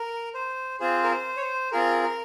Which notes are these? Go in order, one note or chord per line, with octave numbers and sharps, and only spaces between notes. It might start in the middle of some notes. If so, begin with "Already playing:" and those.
Already playing: A#4
C5
C4 F4 G#4 C5
A#4
C5
C#5
C5
C4 F4 G#4 A#4
A#4